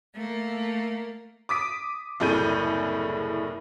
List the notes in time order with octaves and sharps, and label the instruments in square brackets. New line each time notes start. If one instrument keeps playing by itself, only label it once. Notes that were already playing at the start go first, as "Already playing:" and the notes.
[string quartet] A3 A#3
[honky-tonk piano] D6 D#6 B6 D7
F#1 C2 A2 G#4 G6 D#7